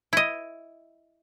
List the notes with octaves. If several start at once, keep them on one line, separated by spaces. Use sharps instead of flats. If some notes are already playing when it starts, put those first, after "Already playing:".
E4 D#5